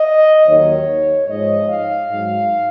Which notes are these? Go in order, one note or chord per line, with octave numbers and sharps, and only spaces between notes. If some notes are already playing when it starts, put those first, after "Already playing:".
Already playing: D#5
D#2 D#3 F#3 C#5
G#2 F3 G#3 D#5
F5
G#2 F#3